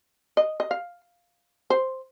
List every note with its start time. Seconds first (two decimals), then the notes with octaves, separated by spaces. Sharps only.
0.37 D#5
0.60 D#5
0.71 F5
1.70 C5